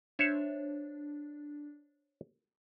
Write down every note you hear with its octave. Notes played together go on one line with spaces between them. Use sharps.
D4 C5 C#5 E5